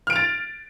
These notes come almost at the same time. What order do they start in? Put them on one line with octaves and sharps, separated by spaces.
F6 D7 F7 A6